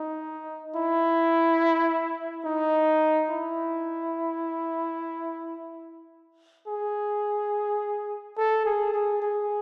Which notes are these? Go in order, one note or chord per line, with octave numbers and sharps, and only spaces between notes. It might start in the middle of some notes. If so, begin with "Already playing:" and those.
Already playing: D#4
E4
D#4
E4
G#4
A4
G#4
G#4
G#4